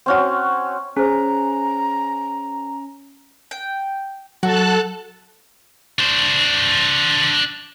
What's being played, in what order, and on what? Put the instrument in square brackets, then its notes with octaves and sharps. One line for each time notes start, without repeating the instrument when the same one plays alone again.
[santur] C4 C#4 F#4
[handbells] C#4 [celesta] G#4 C5 [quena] A#5
[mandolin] G5
[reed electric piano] F#3 [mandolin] F#4 [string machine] A4 A5 F#6
[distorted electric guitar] D4 C5